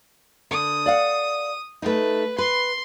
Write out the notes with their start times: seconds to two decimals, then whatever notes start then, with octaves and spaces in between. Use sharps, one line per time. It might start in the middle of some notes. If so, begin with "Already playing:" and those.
0.51 D3 D#6
0.86 D5 F5 F#5
1.82 A3 D#4 B4
2.38 B4 C6